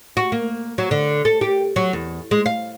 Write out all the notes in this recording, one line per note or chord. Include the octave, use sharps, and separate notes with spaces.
F#4
A#3
F#3
D3
A4
G4
F#3
E2
G#3
F5